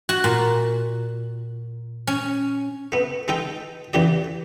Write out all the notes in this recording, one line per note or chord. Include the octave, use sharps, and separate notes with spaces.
F#4
A#2
C#4
A3 B3
G#3 D#4 A4 G5
A1 E2 G4 D5